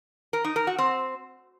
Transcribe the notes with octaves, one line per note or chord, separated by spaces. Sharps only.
A#4
D#4
A#4
F#4
C4